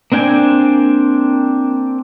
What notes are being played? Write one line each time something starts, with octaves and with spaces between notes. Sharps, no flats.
A#3 C4 D4 G5 G#5